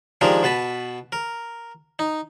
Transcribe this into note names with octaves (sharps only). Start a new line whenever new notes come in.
D#3 F3 G#3 D4 G4 A#4
B2 B4 A5 B5
A#4
D#4